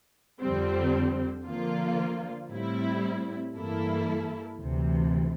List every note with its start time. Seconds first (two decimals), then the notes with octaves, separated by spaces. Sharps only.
0.41 F2 D3 G3 C4
1.46 D3 F3 A#3 F4
2.50 A2 G3 C4 E4
3.55 G2 E3 A#3 E4 A4
4.59 D2 C3 E3